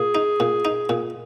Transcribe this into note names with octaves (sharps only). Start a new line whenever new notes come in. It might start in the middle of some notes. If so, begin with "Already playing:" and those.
Already playing: A#2 G#4
D#4
A#2
D#4
A#2